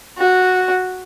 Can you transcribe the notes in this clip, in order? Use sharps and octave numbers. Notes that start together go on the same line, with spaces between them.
F#4